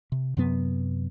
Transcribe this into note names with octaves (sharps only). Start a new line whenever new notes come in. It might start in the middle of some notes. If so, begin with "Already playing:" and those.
C3
F#2 C3 F#3 B3